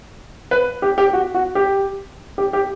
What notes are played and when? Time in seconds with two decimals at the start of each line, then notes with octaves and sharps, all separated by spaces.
0.51 B4
0.82 G4
0.98 G4
1.13 F#4
1.34 F#4
1.55 G4
2.38 G4
2.53 G4